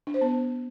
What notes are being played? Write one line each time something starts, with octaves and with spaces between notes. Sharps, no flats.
D4
C5
B3